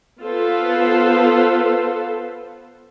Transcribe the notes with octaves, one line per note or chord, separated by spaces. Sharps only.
B3 F4 A4 B4 C5